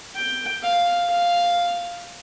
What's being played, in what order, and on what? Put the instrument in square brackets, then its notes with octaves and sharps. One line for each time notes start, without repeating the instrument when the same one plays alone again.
[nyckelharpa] G5
F5
F5